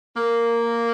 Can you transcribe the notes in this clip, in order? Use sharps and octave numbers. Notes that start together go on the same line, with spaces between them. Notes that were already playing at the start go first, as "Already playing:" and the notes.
A#3